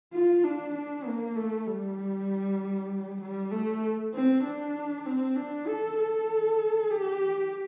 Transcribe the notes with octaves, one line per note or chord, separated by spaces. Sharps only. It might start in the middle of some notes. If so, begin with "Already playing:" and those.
F4
D4
D4
A#3
A3
G3
G3
A3
C4
D4
C4
D4
A4
A4
G4